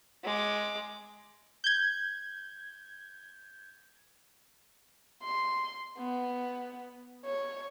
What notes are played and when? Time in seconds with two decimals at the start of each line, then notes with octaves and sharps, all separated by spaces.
0.24 G#3 D6
1.64 G6 G#6
5.23 C6
5.98 B3
7.25 C#5